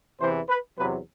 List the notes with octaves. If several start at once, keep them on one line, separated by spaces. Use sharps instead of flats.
E2 C3 E3 C5
B4
E2 C3 F#3 B4